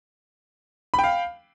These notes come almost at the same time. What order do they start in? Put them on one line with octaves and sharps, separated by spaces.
B5 G5 F5